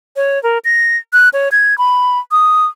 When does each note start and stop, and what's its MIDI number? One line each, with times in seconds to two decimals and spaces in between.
0.16 0.41 73
0.43 0.58 70
0.65 0.97 94
1.13 1.29 90
1.33 1.49 73
1.52 1.77 92
1.78 2.19 83
2.31 2.66 87